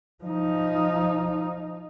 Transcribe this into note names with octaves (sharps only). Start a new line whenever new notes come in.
F3 D#4